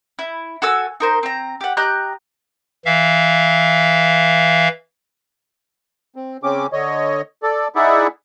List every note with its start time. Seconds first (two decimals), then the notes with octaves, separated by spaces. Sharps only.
0.19 E4
0.62 F#4 A4 G#5 E6
1.00 D#4 A#4 C5
1.23 C4 A#5
1.61 G4 F#5
1.77 G4 D#5 A#5 F#6
2.86 E3 E5 F5
6.16 C4
6.43 C#3 C4 C#4 D6
6.73 D3 C#5 D#5
7.43 A4 D5
7.76 D#4 E4 G#4 D5 E5 F#5